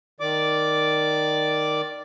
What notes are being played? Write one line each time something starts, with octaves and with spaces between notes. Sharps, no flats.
D#3 D5 D6